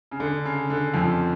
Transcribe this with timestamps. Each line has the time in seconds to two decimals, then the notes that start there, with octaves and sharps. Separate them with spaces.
0.11 C#3
0.20 D3
0.45 C#3
0.70 D3
0.94 F2 F3